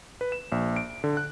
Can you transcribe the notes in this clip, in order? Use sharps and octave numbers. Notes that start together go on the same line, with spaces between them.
B4
E7
A#1
D7
D3
F#6